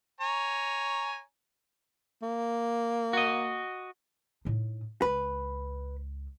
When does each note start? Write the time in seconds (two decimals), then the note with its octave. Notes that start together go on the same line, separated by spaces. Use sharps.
0.21 C#5 G#5 A#5
2.22 A#3
3.13 F#4 D#5
4.45 A2 D#4
5.02 C#2 B4